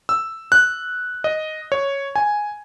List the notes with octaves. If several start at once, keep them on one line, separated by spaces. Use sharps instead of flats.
E6
F#6
D#5
C#5
G#5